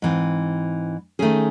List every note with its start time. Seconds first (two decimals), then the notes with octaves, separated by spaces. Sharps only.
0.02 G#2 E3 C4
1.19 D#3 A3 C#4 G#4